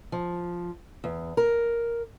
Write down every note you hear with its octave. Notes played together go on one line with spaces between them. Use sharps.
F3
E2
A#4